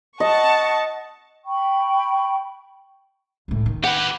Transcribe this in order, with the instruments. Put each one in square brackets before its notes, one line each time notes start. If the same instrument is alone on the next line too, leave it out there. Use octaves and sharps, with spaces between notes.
[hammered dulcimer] D#5 [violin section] F#5 A5 C#6
[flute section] G5 B5 C#6
[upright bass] C#2 A2
D#3
[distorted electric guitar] G4 B4 [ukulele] F#5